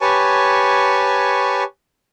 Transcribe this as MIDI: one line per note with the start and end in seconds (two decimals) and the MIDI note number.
0.01 1.64 67
0.01 1.64 71
0.01 1.64 73
0.01 1.64 80
0.01 1.64 81
0.01 1.64 85